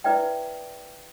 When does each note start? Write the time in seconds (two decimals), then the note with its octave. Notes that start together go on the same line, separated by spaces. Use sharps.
0.04 E4 B4 D5 E5 G5